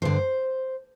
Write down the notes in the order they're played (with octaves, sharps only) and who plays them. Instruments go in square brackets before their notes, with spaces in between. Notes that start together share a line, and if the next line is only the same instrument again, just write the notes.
[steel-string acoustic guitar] G2 D3 C5